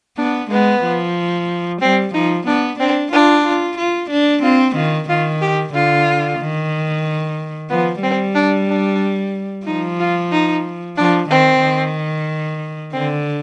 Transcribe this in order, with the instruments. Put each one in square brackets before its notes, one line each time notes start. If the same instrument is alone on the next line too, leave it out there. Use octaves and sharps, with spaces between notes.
[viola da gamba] B3 [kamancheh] D4
[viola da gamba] G#3 [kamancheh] B3
[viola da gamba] F3
[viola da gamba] G3 [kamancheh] C4
[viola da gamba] F3 [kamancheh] D#4
[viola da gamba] B3 [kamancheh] D4
[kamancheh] C4 [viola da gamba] D4
[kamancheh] D4 [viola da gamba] F4
[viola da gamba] F4
F4
D4
[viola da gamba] C4 [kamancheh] F4
[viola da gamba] D#3 [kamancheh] F4
[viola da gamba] D#3 [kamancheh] F4
[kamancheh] G4
[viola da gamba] D3 [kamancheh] F4
[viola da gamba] D#3
[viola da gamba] F3 [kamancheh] B3
[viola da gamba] G3 [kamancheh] C4
[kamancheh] D4
D4
[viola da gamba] F3 [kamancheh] D#4
[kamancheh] F4
D#4
[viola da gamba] F3 [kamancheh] D4
[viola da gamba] D#3 [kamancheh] C4
[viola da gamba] D#3
[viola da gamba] D3 [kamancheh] C4